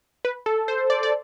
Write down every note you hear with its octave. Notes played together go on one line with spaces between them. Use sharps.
B4
A4
C5
D5
D5